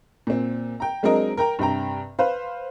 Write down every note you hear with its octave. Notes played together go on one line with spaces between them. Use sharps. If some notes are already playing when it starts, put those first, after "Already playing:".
A#2 C4
G5 A#5
F#3 G#3 C4 D4 A#4 D#5
A#4 G5 A#5
G2 C3 G5 A#5
B4 C5 F5